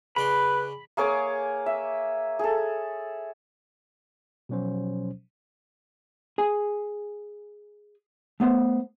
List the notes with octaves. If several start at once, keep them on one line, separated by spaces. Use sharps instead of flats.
C#3 B4 D5 B5 C6
A#3 G#4 C#5 D6
E5
G#4 A4
B2 F3 F#3 C#4 C5
G#4 G#5
A3 B3 C5